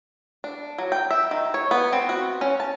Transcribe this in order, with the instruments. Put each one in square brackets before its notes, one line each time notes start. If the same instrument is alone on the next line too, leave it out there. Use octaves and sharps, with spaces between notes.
[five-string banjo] D4
F#3
G5
E5
D#3
C#5
B3
C4
F#4
C#4
A5